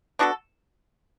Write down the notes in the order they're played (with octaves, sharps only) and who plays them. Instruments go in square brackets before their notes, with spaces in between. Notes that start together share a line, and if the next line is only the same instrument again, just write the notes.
[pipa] B3 D4 F#4 A4